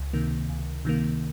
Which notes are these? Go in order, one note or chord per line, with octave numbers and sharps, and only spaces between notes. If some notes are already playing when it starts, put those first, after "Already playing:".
Already playing: C#2
C3 D#3 A#3
C#2
C3 D#3 A#3